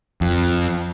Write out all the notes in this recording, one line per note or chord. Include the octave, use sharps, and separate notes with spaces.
F2